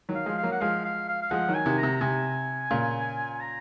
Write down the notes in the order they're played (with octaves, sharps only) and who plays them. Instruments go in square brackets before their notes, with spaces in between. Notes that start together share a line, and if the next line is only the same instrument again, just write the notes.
[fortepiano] D#3 F#3
[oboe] F5
[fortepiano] F3 G#3
[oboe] F5
[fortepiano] F#3 A#3
[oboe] F#5
[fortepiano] F3 G#3 [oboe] F5
[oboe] F5
F5
F5
[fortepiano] F3 G#3 [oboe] F#5
[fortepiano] D#3 F#3
[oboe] G#5
[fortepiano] C3 D#3
[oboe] A#5
[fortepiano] C3
[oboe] A#5
[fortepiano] C3 [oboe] G#5
[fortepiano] A#2 C#3
[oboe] G#5
A#5